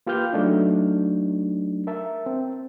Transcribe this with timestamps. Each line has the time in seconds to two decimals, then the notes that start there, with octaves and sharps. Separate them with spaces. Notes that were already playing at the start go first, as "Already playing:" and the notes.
0.07 A#3 F4 G4 B4 F6 G6
0.33 F#3 A3 D4 D#4
1.87 A#4 E5 A5
2.26 C4